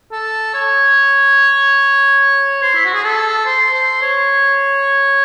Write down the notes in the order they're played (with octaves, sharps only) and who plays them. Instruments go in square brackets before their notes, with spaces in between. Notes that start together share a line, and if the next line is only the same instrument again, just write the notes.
[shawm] A4
C#5
C5
E4
F#4
G#4
A4
C5
C5
C#5